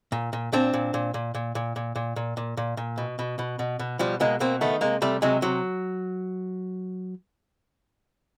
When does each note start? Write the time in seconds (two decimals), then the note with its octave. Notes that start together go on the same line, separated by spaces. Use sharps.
0.12 A#2
0.33 A#2
0.52 A#2 C4 D4
0.73 A#2
0.94 A#2
1.14 A#2
1.35 A#2
1.55 A#2
1.76 A#2
1.95 A#2
2.16 A#2
2.37 A#2
2.57 A#2
2.77 A#2
2.98 B2
3.19 B2
3.39 B2
3.59 B2
3.79 B2
3.99 B2 F3 G3
4.20 B2 G#3 A#3
4.40 B2 A#3 C4
4.61 D#3 A3 B3
4.81 C3 G#3 A#3
5.02 C3 G3 A3
5.22 C3 F#3 G#3
5.42 C3 F#3